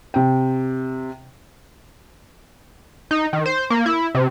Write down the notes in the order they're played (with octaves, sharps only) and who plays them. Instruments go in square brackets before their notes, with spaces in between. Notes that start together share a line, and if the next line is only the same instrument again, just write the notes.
[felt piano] C3 G5
[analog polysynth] D#4
D#3
C5
A#3
E4
C3